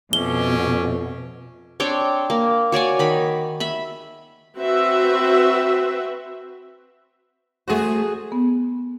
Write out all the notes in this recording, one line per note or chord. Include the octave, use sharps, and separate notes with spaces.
F2 B2 C#4 E5 D6 G7
C4 D4 C#5 G5
A#3
F#4 C#5 D5 G#5
D#3 B5
E5 B5
C4 F#4 B4 E5
A3 F#4 G#4 C5
B3